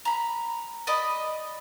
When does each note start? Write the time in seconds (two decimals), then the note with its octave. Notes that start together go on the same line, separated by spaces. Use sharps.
0.05 A#5 B5
0.87 D5 D#5 B5